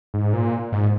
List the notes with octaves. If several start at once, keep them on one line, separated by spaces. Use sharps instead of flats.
G#2
A#2
G#2